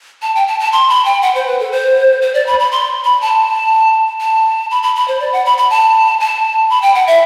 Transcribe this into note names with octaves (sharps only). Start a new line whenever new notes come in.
A5
G5
A5
A5
C6
B5
G5
F#5
C5
B4
A4
C5
C5
D5
B5
B5
C6
B5
A5
A5
B5
B5
B5
C5
D5
F#5
B5
B5
A5
A5
B5
G5
F#5
E5